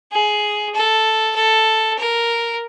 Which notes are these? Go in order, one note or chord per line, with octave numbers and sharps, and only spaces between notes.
G#4
A4
A4
A#4